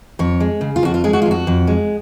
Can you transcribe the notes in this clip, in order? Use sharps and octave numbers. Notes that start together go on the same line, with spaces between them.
F2 C#5
G#3
C#3
F4
F2 F#4
F4
G#3 G#4
F#4
F4
F2
F#4
F2
G#3